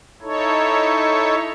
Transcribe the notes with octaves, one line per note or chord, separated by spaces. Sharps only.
D#4 E4 A4 C#5